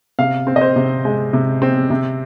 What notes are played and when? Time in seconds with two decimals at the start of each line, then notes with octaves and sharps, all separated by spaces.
0.19 C3 F5
0.47 C4
0.56 D#5
0.61 C5
0.76 C3
1.05 G#3
1.33 C3
1.62 C4
1.90 C3